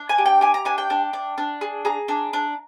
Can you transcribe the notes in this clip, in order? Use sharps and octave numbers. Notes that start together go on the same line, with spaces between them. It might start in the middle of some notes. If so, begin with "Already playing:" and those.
Already playing: D4
G#5
G4
G5
G4 G#5
A#5
D4 G#5
G5
D4
D4
D4
G#4
G#4 A#5
D4
D4